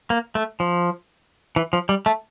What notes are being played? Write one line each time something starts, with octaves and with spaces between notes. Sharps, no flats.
A#3
A3
F3
E3
F3
G3
A3